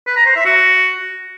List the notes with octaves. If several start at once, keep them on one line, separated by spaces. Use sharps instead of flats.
B4
A#5
C5
E5
F#4